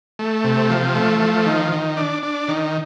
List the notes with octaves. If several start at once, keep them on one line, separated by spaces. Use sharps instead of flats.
A3
C3
F3
A3
F3
D#3
D#3
D4
D4
D#3